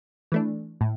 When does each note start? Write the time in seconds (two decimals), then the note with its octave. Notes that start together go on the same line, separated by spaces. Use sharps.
0.32 E3 A3 D4
0.81 A2